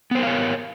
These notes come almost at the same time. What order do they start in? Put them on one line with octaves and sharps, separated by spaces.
B3 C5 A#4 F5 C#5